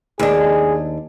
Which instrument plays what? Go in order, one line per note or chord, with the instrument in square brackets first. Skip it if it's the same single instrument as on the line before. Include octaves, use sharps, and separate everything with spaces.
[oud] D#2 D4 [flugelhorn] G#4